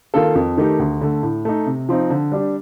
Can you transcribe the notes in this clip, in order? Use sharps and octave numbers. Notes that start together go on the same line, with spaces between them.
D#3 A#3 F4 A4
F2
D#3 A3 D#4 G4
D2
D3 A3
A2
A3 D#4
C3
F3 C4 D#4
D3
G3 D4 G4